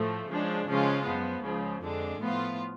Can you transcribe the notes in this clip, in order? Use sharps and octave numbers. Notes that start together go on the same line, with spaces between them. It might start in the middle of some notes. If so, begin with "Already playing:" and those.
Already playing: A2 F3 A3
C#3 F3 G#3 D4
C#3 F3 G#3 C#4 F4
F#2 F3 B3
C#2 C#3 F3
F2 D3 G#3 D4
A2 F3 B3 F4